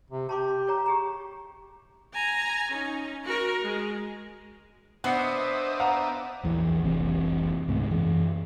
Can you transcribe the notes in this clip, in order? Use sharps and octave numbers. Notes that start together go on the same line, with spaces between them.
C3
G4 A5 C6 D6
A#4 C#5 A#5
G4 G#4 A#5
G#5 A#5
C#4 D#4
F#4 A#4
G#3
B3 D4 C5 D#5 E5 F#6 C7 C#7
F5 F#5 A#5
A#1 E2 E3
F1 C2 C3 E3
C#2 G#2 C3 A3
F#2 E3